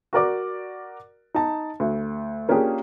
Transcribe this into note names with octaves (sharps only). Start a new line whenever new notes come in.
F#4 A#4 D5 D6
D#4 A5
D2
A#3 C#4 D4 F4 G4 G#4